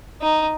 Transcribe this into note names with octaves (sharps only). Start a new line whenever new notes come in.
D#4